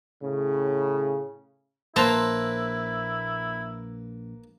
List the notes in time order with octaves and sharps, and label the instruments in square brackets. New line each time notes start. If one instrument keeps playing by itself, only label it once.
[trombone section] A2 C#3
[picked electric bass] A#1 [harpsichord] A#3 B4 [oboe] E4 [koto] C5 A5 A#5